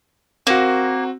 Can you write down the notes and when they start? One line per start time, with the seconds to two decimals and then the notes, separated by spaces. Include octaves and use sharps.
0.47 A#3 C4 F#4